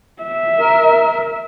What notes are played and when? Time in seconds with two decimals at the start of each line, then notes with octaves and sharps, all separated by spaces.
0.23 E5
0.60 A#4